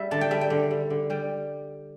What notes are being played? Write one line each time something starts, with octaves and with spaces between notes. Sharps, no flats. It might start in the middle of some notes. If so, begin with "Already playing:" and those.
Already playing: G3 E5
D3 A5
G5
G3 E5
G5
D3
G3
D3
G3 G5